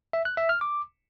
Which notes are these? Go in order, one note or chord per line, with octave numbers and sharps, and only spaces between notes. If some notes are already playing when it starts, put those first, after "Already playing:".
E5
F#6
E5
F6
D6